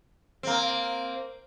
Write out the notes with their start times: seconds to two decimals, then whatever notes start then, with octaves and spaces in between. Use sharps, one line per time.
0.43 A#3 C4